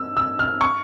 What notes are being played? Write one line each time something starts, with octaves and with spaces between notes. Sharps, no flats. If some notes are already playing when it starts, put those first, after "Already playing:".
Already playing: E6
E6
F6
C#6